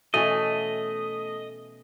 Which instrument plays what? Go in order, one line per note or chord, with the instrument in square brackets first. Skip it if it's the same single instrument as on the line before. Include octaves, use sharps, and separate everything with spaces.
[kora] B2 E3 C#4 [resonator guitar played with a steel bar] A3 [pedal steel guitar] D#5